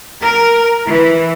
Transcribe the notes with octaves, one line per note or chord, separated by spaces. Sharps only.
A#4
E3